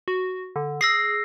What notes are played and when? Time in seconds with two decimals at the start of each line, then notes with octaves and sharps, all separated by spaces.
0.08 F#4
0.56 D3
0.81 G#4 E6 A#6 C7